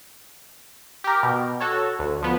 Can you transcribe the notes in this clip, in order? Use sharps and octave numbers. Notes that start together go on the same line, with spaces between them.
G4 A#4
B2
F#4 A4 C#5
D2
F3 B3